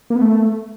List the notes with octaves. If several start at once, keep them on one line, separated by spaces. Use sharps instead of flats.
A#3
B3
A3